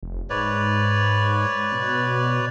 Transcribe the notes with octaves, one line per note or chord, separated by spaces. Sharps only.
F1
G#2 B4 C#5 D5
B2